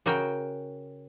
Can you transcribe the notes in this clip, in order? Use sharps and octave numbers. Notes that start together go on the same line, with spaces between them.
C#3 F#4 A#4 G5